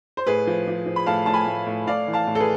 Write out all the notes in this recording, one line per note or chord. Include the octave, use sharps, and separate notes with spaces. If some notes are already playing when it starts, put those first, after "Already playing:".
C5
A2 G#4 B4
F3
F3
F3
B5
A2 F5 A5
A2 A5
G#5 B5
A2
A2
A2 D5 F5
E3
F5 A5
A2
A4
G#4 B4